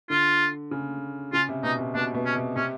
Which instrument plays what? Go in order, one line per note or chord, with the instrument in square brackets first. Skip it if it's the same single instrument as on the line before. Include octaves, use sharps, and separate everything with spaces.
[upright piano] D3 [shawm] F4
[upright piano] C#3
[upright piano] C#3 [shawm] F4
[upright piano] C3
[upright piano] B2 [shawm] D#4
[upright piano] C3
[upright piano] B2 [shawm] D4
[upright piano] B2
[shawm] C#4
[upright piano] C3
[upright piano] C3 [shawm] C#4